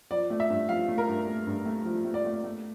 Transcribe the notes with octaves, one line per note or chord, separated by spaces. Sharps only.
F3 D5
A3
E5
G2
F3 F5
A3
A#4
G2
A3
G2
A3
F3
A3
D5
A3
A3